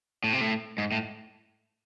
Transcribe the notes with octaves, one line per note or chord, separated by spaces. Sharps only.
A2
C3
A2
G#2
A2